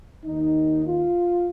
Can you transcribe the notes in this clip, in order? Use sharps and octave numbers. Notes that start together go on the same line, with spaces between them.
D#2 D#3 D#4
F4